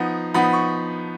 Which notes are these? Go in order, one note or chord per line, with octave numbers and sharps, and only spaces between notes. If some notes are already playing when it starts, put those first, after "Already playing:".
Already playing: F3 B3 D#4
F3 B3 D#4 B5
C#6